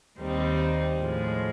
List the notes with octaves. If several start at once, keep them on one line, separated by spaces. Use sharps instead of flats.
D#2 D#3 G3 C4 D#4
A2 F3 G#3